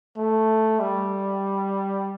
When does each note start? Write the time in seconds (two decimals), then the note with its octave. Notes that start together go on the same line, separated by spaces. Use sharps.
0.18 A3
0.80 G3